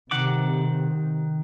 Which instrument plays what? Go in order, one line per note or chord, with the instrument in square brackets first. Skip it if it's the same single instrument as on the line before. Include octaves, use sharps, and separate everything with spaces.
[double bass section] C3 [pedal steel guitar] D#3 F#5 D6